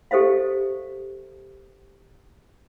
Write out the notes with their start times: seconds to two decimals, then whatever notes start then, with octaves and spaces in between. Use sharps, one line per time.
0.11 G4 A4 C5 E5 F5